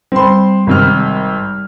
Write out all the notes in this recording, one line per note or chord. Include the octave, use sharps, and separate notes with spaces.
G3 C4 B5 C6
G#1 C3 F6